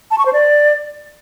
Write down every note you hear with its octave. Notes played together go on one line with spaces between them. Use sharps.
A5
C#6
C5
D5